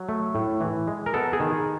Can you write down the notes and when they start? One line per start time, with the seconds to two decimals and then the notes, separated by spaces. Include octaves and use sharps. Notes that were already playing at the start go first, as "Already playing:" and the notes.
Already playing: F#3
0.09 A3
0.35 A2
0.61 E3
0.87 G#3
1.06 A#4
1.14 B3 A4
1.33 G#4
1.40 D#3